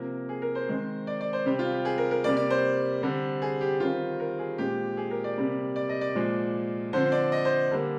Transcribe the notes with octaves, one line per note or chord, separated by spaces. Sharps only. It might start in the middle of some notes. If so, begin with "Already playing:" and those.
Already playing: C3 F3 A#3 A#4
G#4
A#4
C5
D#3 G#3 C4
D5
D5
C5
C3 G3 C4 G4
F4
G4
G#4
A#4
A#4
C3 G3 A#3 D5
D5
C5
D3 G3 C4
G#4
G4
D#3 G3 C4 F4
A#4
G#4
A#2 G#3 C4 G4
G#4
A#4
D5
C3 G3 A#3
D5
D#5
D5
A#2 F3 G#3
D3 F3 C4 C5
D5
D#5
C5
D3 G3 A#3